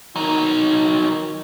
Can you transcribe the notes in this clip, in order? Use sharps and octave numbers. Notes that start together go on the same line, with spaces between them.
D#3 F#3 D#4